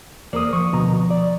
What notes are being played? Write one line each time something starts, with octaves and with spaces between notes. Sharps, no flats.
E2 A#3 A#4 C5 D5 D#6
F3 C#6 D#6
D2 B2 A#5
D5